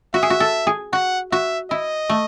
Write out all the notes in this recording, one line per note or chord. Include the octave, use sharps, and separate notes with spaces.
F#4 E5
G#4
F#4
A4
G#4
F#4 F#5
F#4 E5
E4 D#5
A3